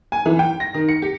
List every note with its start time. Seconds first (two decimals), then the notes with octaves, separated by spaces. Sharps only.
0.12 G#5
0.26 E3
0.39 G5
0.60 A#6
0.74 D#3
0.89 C#7
1.02 G4